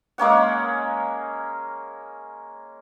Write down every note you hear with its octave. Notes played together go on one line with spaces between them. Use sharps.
G#3 A#3 C#4 F#5